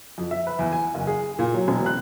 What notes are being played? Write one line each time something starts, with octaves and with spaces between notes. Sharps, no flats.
F2
E5
B4
E2
G#5
F#1
G#4
A#2
F#3
E1
F#6